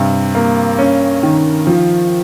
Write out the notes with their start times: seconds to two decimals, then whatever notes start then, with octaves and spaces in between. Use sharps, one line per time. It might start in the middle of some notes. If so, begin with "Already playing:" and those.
Already playing: G2 C3
0.35 A#3
0.78 C#4
1.23 D#3
1.67 F3